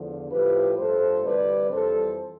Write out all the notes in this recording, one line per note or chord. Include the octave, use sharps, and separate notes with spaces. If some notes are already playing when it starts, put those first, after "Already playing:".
Already playing: E2 D3 F3
A2 F3 A3 G4 B4
G2 F3 A3 A4 C5
D2 C3 E3 G3 B4 D5
F2 E3 G3 A4 C5